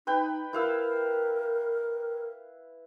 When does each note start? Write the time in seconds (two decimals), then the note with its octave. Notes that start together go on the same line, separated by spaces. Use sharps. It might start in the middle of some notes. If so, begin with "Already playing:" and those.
0.07 D#4 B4 G5 B5
0.53 E4 A#4 F5 E6